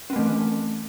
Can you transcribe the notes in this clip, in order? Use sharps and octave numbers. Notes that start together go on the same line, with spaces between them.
E3 A3 C4 C#4